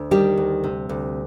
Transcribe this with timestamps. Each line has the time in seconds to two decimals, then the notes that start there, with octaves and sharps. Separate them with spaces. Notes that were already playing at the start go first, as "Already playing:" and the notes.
Already playing: D2
0.11 D#3 G3 G4
0.37 D2
0.64 C3
0.89 D2